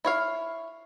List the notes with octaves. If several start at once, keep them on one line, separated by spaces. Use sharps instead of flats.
E4 C#5 F5